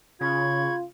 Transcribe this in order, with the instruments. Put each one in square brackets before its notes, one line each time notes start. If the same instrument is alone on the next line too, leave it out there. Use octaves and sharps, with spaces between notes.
[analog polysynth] C#3 [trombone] F4 [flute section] B5 C#6 G#6